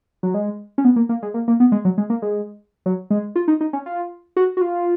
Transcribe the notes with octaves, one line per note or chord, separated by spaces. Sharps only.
F#3
G#3
C#4
B3
A#3
A#3
G#3
A#3
A#3
B3
G#3
F#3
G#3
A#3
G#3
F#3
G#3
F4
D#4
D#4
C#4
F4
F#4
F#4
F4